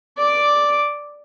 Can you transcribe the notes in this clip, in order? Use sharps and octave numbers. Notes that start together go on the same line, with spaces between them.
D5 D6